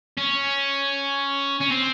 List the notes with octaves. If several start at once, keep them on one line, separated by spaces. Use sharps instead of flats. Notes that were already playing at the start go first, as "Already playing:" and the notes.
C#4
C#4
C4